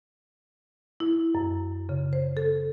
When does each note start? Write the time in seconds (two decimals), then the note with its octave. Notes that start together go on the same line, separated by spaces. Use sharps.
1.00 E4
1.35 F#2
1.89 C#3
2.13 C5
2.37 A4